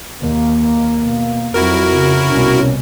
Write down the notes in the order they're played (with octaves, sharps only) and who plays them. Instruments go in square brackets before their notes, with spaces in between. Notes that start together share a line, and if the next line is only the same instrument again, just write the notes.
[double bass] D#2 [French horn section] A#3
[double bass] B2
[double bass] F2 F#3 [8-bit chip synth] E4 F#4 A#4
[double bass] C#3
[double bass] C2 B2 [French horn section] C#4